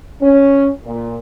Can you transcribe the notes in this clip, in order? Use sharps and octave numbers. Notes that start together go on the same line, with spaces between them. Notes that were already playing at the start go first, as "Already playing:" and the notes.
C#4
A#2